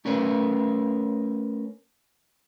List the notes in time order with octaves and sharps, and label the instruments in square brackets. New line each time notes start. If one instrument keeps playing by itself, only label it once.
[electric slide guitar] A3 C#4 A#4 B4 C#5